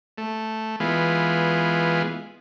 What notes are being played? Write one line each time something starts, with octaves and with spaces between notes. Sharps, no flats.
A3
E3 G#3 B3 F4